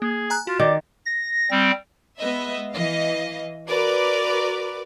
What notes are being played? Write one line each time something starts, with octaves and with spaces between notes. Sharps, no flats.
A#3 G#4
G#5 A#5 F#6
F4 F#4
D#3 D5
A#6
G3 C4
G#3 B3 B4 D#5 E5
E3 D#5 F5
F#4 A#4 B4 D5 D6